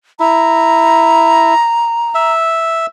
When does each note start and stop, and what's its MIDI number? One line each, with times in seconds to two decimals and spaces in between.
0.20 1.54 64
0.20 2.33 82
2.15 2.86 76